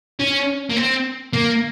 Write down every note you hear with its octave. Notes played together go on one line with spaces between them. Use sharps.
C#4
A#3
C4
A#3